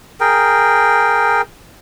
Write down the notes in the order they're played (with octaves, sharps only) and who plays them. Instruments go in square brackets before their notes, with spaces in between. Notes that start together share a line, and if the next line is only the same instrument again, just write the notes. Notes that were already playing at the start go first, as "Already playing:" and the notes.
[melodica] G#4 A#4 G5